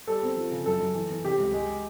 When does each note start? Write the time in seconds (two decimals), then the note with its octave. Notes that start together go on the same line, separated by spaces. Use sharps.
0.07 G3 A4
0.23 C4
0.37 F3
0.51 C#3
0.66 F#2 A4
0.80 F#2
0.95 E3
1.10 E3
1.24 C3 G4
1.39 C#2
1.53 G#3